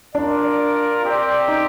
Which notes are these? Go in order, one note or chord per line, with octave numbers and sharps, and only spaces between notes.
D4 F4 A#4 D5
C4 G4 D5
D#4